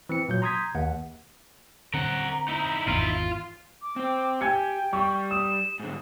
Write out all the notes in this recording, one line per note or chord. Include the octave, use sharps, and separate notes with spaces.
E3 C4 C#7
A#2 F#3 G6
A#5 C6 D#6 G6 G#6 B6
D#2 F#5
D3 C4 A#4 F#5 A#5
D#4 E4
G#1 E2 F4
D6
C4 C5
G4 G5 G#5 G#6 C#7
G3 C#6
D#6 E7
G#2 D3